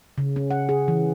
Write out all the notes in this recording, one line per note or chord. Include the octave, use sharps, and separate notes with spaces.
C#3
C#4
F#5
G#4
E3